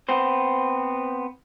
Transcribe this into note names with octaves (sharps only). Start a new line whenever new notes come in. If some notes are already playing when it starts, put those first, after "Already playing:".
B3 C4 C5